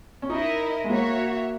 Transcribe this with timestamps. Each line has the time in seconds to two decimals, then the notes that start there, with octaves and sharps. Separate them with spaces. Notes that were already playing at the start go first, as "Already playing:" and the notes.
0.22 C#4
0.30 D#4 E4 A#4 D#5
0.84 G#3
0.89 A#3 F#4 C#5 E5